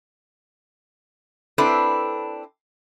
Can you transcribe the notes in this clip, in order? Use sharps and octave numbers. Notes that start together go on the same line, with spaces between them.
C4 D4 E4 A4 B4